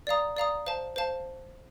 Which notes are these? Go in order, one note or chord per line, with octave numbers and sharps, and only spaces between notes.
D5 F5 A#5 D#6
D5 F5 A#5 D#6
C5 F5 A5
C5 F5 A5